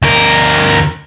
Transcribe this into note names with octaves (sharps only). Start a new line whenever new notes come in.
D2 A#4